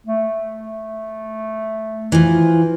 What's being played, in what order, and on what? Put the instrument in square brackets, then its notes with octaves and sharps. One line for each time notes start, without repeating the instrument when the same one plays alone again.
[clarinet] A3
[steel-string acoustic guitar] E3 F3